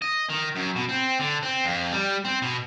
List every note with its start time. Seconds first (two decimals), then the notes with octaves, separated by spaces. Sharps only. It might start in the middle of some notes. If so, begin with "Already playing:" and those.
0.02 D#5
0.30 D#3
0.56 F#2
0.76 B2
0.89 C4
1.19 D3
1.43 C4
1.65 F2
1.92 G3
2.25 C4
2.42 B2